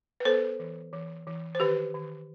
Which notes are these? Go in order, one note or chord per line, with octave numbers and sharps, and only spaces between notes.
B4
B3 A4 C5
E3
E3
E3
C5
D#3 G4 B4
D#3